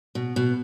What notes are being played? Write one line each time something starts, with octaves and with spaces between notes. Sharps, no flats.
B2
B2